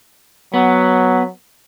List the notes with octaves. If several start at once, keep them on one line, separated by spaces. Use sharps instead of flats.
F#3 B3